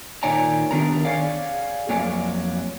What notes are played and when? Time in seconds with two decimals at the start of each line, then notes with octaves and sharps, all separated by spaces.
0.23 A#2 D#3 C#5 D5 G#5 A#5
0.71 D#3 B3 D4 A#4 A#5
1.05 G#4 C#5 D5 F5 F#5
1.89 F2 F#3 A#3 C#5 D5 G#5